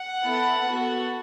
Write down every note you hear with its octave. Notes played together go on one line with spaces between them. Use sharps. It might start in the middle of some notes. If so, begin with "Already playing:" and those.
Already playing: F#5
B3 E4 A4
B3 F#4 A4